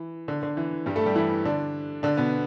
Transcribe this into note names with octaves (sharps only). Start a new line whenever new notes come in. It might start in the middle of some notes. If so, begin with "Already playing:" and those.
Already playing: E3
D3
D3
E3
G2 G3
A3 A4
G3 G4
E3 E4
D3 D4
D3 D4
B2 B3